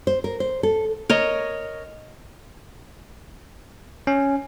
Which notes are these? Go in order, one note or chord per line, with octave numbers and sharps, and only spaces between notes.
C5
A#4
C5
A4
A#4 C#5 D#5
C#4